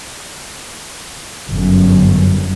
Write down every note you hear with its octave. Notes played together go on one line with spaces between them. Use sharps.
G1 F#2